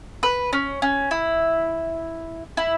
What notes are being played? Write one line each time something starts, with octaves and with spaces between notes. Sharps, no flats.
B4
C#4
C#4
E4
E4